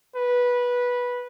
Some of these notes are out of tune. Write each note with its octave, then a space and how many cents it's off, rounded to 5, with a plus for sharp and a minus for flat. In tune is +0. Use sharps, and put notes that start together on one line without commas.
B4 -15